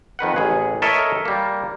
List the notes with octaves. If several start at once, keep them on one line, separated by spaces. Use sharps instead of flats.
F2 D#3 B4 F#5
A1 G#4
A4 A#4 C#5 D#5 E5
G3 A#3